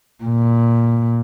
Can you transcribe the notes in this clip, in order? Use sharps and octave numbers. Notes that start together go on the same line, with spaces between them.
A#2